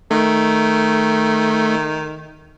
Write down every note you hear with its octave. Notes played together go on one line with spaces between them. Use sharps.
D#3 A3